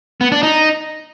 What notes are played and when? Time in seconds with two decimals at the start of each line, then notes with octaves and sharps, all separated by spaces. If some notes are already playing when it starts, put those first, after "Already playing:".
0.21 B3
0.32 D4
0.43 D#4